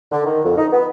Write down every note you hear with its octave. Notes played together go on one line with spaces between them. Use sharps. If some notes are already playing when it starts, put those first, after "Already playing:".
D3
D#3
F2
D#4
B3